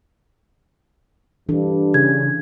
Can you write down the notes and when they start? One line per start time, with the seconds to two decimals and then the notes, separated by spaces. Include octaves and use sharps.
1.49 G2 E3 D4 A4
1.94 C#3 G#6